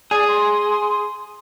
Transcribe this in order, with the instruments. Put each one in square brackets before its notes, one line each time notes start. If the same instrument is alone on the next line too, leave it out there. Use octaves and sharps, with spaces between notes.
[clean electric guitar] G#4 [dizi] D5
[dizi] C6